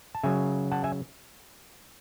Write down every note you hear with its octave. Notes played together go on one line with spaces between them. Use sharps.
A5
C#3 F#3 E5 G#5
F#5 A5
E5 G#5